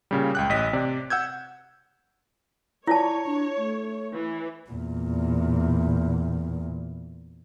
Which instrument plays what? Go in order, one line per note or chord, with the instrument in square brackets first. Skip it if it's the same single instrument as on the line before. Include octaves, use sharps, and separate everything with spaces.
[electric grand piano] A#2 C#3 G3
C#2 G5 F#6
A1 D#5 B6
C3 D5
F#5 E6 G6 G#6
[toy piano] E4 F4 A5 [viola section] C#5 [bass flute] D5
[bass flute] D4
A3
[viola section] E3
[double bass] E2 A#2